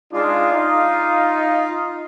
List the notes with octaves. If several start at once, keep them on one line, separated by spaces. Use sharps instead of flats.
G#3 D4 D#4 F4
D#4